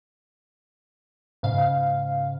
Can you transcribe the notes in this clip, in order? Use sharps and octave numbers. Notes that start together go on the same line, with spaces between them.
G#2 C#3 F5